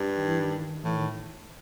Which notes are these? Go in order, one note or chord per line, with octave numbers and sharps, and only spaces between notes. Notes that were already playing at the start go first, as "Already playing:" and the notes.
Already playing: G2
D#3
E3
D#3
A2 E3
D#3